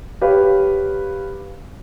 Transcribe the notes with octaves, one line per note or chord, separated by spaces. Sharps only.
G4 B4 C#5 F5